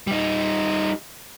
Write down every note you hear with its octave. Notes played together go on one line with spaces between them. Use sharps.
G3 D#4